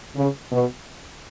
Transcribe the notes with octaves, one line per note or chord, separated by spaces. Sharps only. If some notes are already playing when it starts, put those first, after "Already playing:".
C#3
B2